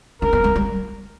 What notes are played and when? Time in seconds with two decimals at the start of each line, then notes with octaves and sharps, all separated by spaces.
0.22 C#4 A#4
0.33 B3
0.44 G#3
0.56 G3